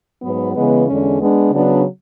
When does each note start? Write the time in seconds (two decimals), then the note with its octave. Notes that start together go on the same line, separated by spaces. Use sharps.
0.22 G#2 F#3 B3
0.55 C#3 E3 G#3 B3
0.87 E2 D3 G#3 C#4
1.20 G#3 B3 D4
1.51 C#3 F#3 B3 D4